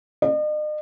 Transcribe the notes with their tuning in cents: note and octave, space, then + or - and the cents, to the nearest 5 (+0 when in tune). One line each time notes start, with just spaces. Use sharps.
D#5 -45